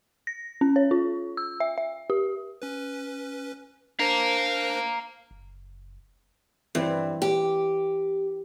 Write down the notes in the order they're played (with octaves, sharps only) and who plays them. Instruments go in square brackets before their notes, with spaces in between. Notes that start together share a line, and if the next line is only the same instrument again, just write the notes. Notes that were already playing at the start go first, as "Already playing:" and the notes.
[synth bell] A#6
C#4
C#5
F4
E6
E5
E5
G4
[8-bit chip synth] C#4 B4
[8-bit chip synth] D4 A#4 C5 [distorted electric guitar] F5 A#5
[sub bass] F#1
[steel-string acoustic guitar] G2 [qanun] E3 C4
[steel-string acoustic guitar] G4